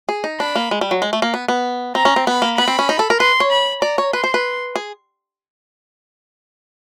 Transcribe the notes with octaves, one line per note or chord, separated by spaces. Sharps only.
G#4
D#4
D4 B5
A#3
G#3
G3
F#3
G#3
A3
A#3
B3
B3
C4 A#5
C#4
C4
B3 B5
A#3
B3 B5
C4
C#4
D#4
A4
A#4
B4 C6
C#5
B5
D5 A#5
C#5
B4 C6
C5
B4
G#4